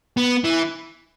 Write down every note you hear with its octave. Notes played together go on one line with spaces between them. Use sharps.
B3
E3